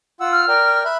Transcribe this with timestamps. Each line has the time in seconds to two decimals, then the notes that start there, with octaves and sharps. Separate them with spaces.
0.21 F4 F#5 E6
0.32 F6
0.48 A#4 D5 G5
0.85 E5 B5 F#6